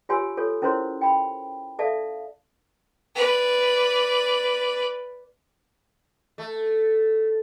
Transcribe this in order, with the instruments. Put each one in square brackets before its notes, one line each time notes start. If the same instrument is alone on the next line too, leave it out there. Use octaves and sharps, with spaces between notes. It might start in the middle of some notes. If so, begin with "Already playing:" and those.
[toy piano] F4 G4 C#5 G#5 C6 E6
F4 A4 C#5
C#4 E4 A#4 C5 C#5 C6
G5 B5
A4 D5 E5 F5 A5
[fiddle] B4 D5
[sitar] A3